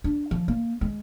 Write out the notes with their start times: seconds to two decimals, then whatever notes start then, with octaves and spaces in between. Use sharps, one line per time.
0.04 D4
0.31 F3
0.48 A#3
0.81 G#3